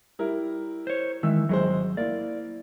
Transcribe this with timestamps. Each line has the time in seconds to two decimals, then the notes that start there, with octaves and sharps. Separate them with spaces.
0.19 G3 E4 A#4
0.87 C5 C#5
1.23 D#3 E3 G#3 E5 E6
1.49 G#1 F#3 G#3 C5
1.97 A#3 E4 D5